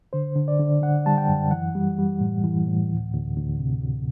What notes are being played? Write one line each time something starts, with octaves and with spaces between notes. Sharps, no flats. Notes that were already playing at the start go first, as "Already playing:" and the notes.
D3 C5
D3
D5
D3
D3 F#5
G3 A5
G5
F#2
E3 F#5
G3
G3
A2
E3
A2
D2
D2
D2
C3
D2